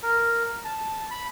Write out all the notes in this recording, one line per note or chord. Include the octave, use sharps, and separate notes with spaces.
A#4
A5
B5